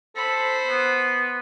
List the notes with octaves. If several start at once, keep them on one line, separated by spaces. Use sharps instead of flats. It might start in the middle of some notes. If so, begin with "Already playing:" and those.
A4 C5 B5
B3